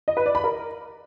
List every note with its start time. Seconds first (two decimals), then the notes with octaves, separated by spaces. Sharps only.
0.08 D#5
0.17 B4
0.26 D5
0.35 B5
0.44 A#4